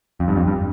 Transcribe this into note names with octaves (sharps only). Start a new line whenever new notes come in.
F2
G2
F2
G2